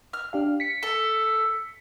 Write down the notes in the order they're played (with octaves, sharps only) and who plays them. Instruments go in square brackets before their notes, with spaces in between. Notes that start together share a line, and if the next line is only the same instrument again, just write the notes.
[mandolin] F6
[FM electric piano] D4 G4 F5
B6 C#7
[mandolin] A4